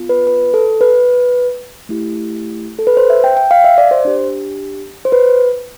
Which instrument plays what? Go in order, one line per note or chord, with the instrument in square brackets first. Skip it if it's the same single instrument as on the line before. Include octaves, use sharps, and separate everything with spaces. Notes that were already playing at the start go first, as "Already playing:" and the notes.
Already playing: [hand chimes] B3 F4
B4
B4
A4
B4
A3 E4 G4
A4
B4
C5
E5
G5
G5
F5
E5
D5
C5
D4 G4
C5
B4